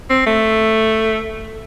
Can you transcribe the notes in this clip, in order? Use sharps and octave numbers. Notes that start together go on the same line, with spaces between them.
C4
A3